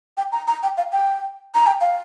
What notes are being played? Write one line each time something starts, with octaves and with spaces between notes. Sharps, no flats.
G5
A#5
A#5
G5
F5
G5
A#5
G5
F5